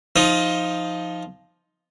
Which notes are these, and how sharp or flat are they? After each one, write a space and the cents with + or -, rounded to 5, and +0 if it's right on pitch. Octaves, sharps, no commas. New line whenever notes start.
F3 +0 D#4 +10 D#6 +30